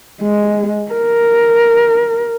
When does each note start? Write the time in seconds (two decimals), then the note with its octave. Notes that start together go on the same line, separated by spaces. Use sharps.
0.21 G#3
0.92 A#4